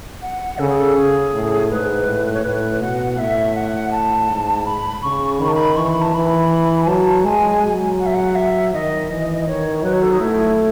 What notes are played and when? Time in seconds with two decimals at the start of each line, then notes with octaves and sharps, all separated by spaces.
0.22 F#5
0.59 C#3 A4
0.69 G#4
0.79 A4
0.96 G#4
1.34 A2
1.70 G#2 B4
2.07 A2
2.34 C#5
2.44 A2 B4
2.81 B2 F#5
3.18 A2 E5
3.55 F#5
3.92 A5
4.29 G#2
4.65 B5
5.03 C#3 C#6
5.40 D#3 B5
5.48 A5
5.55 B5
5.77 E3 C#6
5.89 B5
6.02 A5
6.14 E3 B5
6.82 G#5
6.88 F#3 A5
7.25 G#3 G#5
7.62 F#3
8.00 F#5
8.06 E5
8.14 F#5
8.35 E5
8.73 D#3 D#5
9.10 E3
9.47 D#3 C#5
9.84 F#3 B4
9.93 C#5
10.02 A4
10.11 D#4
10.20 A3 E4